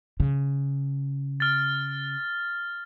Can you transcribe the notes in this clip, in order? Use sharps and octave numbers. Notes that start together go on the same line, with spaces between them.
C#3
F6 A6